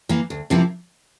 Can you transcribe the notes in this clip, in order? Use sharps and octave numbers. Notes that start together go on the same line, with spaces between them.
E3 A#3
D2
C3 F3 A#3 E4